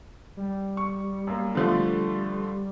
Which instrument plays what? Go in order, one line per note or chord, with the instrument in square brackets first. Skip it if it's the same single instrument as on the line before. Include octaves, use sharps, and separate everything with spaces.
[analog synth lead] G3
[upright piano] C#6
F#2 A#3
D3 F3 A3